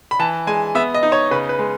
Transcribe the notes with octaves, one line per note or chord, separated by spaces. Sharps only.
B5
E3 A5
G#3 G#5
B3 E5
D#5
D#4
C#5
C#3 B4
B4
G#3